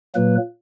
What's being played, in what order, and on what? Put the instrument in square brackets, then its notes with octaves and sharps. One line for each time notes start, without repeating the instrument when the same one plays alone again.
[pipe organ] A#2 F#3 A#3 B4